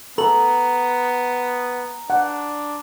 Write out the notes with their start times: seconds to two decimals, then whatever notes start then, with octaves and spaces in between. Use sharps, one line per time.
0.18 B3 A4 A#5 F#7
2.10 D4 F#5